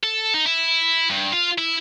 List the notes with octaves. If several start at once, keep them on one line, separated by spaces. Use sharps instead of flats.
A4
D#4
E4
G2
F4
E4